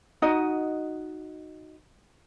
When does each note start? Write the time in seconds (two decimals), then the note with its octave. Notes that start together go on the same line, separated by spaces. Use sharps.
0.22 D#4 F#4 D#5